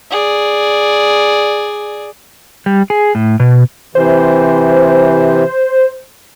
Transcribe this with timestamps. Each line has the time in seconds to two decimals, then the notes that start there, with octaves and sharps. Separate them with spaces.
0.11 G#4 D5
2.66 G3
2.90 G#4
3.15 A2
3.40 B2
3.95 C3 E3 C5